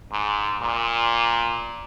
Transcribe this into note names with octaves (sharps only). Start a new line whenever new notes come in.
G#2
A#2